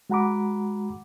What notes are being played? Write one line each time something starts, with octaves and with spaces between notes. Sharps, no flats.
G#3 F#4 F#5 A#5 B5 D6